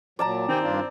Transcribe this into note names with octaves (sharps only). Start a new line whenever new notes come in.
A#2 F#3 D5 A5 A#5
D#3 C4 G4 G5 G#5
G2 D4 F4